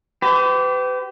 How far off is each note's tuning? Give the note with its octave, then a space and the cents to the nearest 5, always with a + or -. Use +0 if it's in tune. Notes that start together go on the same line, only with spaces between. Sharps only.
G4 -25 B4 +40